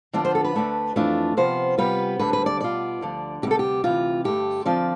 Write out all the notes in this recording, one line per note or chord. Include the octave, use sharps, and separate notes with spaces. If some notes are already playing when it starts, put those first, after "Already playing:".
D3 F3 B3 D4 F4 D5
C5
A4
B4
D2 D3 A3 D4
F2 E3 A3 D4 F4
C3 F3 B3 F4 C5
C3 G3 B3 F4 B4
D2 D3 G3 B4
B4
D5
B2 B3 F4 D5
D2 D3 F3
D2 C3 G3 B3 E4 G4
A4
G4
D2 C3 E3 F4
G2 D3 A3 G4
D2 D3 F3 C4 F4 D5